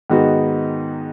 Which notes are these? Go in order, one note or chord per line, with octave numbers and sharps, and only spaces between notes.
G#2 D#3 B3 D#4 F#4